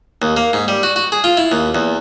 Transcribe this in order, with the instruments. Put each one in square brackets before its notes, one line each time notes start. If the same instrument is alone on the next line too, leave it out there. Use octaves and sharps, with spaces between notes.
[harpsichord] D#2
A#3
G#2
G3
F#4
F#4
G#4
F4
E4
D#2
E2